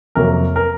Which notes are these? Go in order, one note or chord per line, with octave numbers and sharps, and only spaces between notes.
F2 C3 F#3 A#3 A#4
A#4